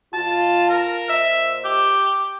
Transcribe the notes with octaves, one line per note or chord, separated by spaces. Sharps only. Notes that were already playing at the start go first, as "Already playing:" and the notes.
F2 F4 A5
A#4
A#2 C5 D#5 E5
G4